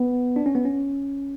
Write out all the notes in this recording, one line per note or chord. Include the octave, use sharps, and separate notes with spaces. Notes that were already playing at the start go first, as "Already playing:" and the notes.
Already playing: B3
D4
C#4
B3
C#4